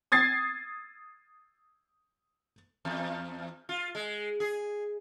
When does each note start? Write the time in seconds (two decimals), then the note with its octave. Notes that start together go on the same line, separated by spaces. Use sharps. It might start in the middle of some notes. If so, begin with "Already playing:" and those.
0.12 D#6 G#6 A6 C7
2.85 E2
3.69 F4
3.95 G#3
4.40 G#4